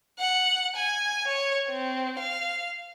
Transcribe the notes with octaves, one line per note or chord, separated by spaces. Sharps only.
F#5
G#5
C#5
C4
F5